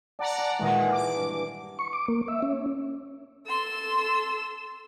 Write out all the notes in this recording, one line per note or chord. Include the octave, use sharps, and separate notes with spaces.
D5 F#5 A5 A#5
G#5
A#2 D#3 E3 G#3 F#4
D6
G2
C#6
D6
A#3
E5
C#4
A4 C6 E6